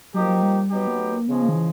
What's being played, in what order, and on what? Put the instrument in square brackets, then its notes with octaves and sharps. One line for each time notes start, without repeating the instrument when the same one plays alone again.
[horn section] F3 A#3 D#4 G4 [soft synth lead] F#3
[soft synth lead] F#3
G3
[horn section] F#3 B3 D#4 G4
[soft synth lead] A#3
A3
A#3
[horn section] C#3 F3 G#3 [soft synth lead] B3
[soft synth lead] A#3
D#3
E3